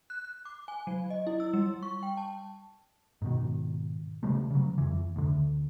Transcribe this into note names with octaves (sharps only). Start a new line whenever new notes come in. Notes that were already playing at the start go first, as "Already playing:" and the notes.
F#6
F#6
D6
G#5
F#3
D#5
E4
E6
G3
C#6
G5
A5
G#2 B2 D#3
C#3 G3 A3
C#3 F#3
F2 E3
D2 D3